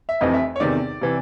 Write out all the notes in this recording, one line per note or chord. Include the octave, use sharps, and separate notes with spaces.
E5
F1 F2 C3 E3 D#5
E5
C#5
E2 C3 D#3 D5
C3 E3